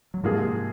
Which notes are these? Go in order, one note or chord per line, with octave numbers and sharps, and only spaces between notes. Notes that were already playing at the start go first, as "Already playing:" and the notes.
F#3
G#2 C3 F3 G#3 A#3 F4 G#4